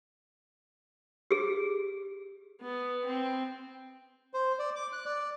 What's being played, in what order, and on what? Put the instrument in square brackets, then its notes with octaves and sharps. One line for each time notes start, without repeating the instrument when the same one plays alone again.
[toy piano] G4 G#4
[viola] B3
C4
[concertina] C5
D5
D6
F#6
D5